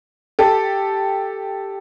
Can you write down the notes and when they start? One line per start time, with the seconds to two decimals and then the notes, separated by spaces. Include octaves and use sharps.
0.39 G4 A4